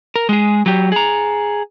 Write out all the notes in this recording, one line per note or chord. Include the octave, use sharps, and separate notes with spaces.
A#4
G#3 G#4
F#3 G4
G#4 A#5